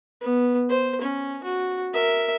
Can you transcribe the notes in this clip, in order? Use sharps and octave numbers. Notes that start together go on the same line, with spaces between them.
B3
C5
C#4
F#4
A#4 E5